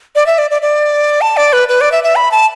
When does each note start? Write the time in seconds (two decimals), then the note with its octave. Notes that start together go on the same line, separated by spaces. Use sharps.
0.15 D5
0.26 E5
0.38 D5
0.51 D5
0.62 D5
1.21 A5
1.37 D5
1.53 B4
1.69 B4
1.81 D5
1.92 E5
2.04 E5
2.16 B5
2.31 A5